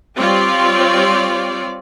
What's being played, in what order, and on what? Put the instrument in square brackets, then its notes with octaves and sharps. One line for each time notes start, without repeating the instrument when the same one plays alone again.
[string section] G3 C4 F4 G4 C#5 D5